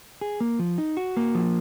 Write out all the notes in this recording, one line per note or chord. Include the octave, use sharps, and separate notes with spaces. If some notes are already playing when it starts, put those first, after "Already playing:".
G#4
A#3
F3
D#4
F#4
A#3
F3